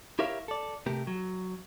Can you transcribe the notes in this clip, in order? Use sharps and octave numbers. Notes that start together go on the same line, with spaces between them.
E4 G4 A#4 C#5 E5 F5
A4 D5
C3 A3 G4 A#4
F#3